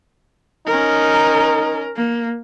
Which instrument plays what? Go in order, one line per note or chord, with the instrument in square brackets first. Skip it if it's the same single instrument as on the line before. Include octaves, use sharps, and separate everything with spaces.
[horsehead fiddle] C#4 A#4 [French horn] D#4
[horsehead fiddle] A#3